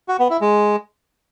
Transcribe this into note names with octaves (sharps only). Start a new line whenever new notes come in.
F#4
B3
E4
G#3